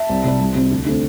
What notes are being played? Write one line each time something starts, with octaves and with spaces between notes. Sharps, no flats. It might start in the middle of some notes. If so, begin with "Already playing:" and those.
Already playing: E5 A5
C2
C3 G3
C2
C3 G3 C4
D2
D3 A3 C4